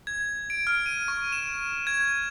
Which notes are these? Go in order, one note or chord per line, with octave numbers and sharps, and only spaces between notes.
G#6
D7
F6
D#7
C#6
E7
G#6